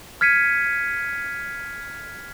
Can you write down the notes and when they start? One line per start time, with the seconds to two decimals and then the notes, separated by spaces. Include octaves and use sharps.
0.21 F6 G#6 B6 C#7 D#7